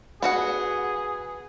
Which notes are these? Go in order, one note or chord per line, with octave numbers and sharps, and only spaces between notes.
B3 F#4 G#4 F#5